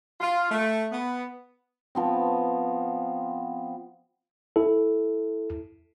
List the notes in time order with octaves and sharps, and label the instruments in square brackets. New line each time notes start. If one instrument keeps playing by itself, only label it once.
[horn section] F4
A3
B3
[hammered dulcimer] F3 B3 C4
[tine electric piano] E4 A4